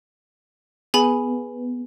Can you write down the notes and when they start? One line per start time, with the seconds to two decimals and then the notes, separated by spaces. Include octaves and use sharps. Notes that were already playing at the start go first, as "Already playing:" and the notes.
0.94 B3 G#4 G#5 B5